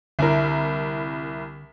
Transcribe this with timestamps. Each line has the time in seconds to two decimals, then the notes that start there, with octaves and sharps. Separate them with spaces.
0.19 C2 D3 E4 A#4